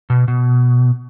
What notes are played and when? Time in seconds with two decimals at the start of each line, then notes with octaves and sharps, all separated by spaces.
0.10 B2
0.28 B2